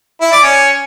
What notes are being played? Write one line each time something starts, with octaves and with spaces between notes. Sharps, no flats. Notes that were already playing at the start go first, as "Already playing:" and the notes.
E4
D5
C#4